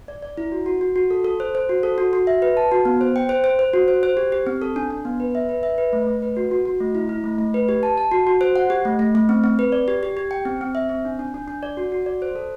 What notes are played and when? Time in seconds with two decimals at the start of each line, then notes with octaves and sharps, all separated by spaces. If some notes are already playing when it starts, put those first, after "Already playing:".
0.08 D5
0.22 D5
0.37 E4
0.52 F#4
0.66 F#4
0.81 F#4
0.96 F#4
1.11 A4
1.25 A4
1.40 C5
1.55 C5
1.69 F#4
1.83 A4
1.98 F#4
2.13 F#4
2.27 E5
2.42 B4
2.57 A5
2.71 F#4
2.85 B3
3.01 C5
3.16 G5
3.29 C5
3.44 C5
3.59 C5
3.74 F#4
3.88 C5
4.03 C5
4.17 G4
4.32 G4
4.47 C4
4.62 A4
4.76 D4
4.91 D4
5.05 B3
5.20 B4
5.35 E5
5.49 B4
5.63 E5
5.78 B4
5.93 A3
6.07 A3
6.22 B4
6.37 F#4
6.51 F#4
6.65 F#4
6.80 A3
6.95 E4
7.09 E4
7.24 A3
7.38 A3
7.54 B4
7.69 G4
7.83 A5
7.97 A5
8.12 F#4
8.27 F#4
8.41 C5
8.56 F#5
8.70 G4
8.85 A3
8.99 A3
9.15 A3
9.29 C4
9.44 C4
9.59 B4
9.72 D5
9.88 G4
10.03 G4
10.17 G4
10.31 G5
10.45 C4
10.61 C4
10.75 E5
10.89 C4
11.05 D4
11.19 D4
11.34 D4
11.48 D4
11.63 D5
11.77 F#4
11.92 F#4
12.06 D5
12.22 C5
12.35 A4